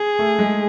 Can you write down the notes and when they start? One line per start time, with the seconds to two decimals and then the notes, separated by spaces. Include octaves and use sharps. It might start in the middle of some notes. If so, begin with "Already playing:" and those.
Already playing: G#4
0.19 A3
0.39 G#3